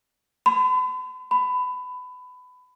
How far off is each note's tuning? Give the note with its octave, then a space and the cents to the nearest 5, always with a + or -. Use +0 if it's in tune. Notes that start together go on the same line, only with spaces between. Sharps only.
B5 +45
B5 +20